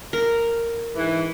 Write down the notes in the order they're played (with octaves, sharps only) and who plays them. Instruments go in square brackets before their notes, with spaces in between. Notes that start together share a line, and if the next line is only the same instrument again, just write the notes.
[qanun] A#4
[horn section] G#2 E3